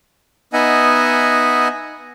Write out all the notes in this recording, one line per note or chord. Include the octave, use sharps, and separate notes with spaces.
B3 D#4 D#5 E5 F#5 G#5